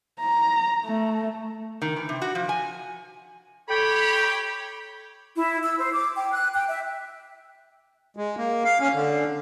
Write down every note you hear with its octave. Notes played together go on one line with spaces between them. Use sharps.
A#5
A3
D#3
E3
C3
F#4
F3
G#5
G4 A4 C#5 G5 B5
E4
E6
C5
D6
G5
F#6
G5
E5
G#3
A#3
F5
C#4
D3